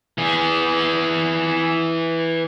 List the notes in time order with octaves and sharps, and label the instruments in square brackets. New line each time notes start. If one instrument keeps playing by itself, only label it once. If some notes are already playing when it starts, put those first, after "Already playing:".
[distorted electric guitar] E3 G#4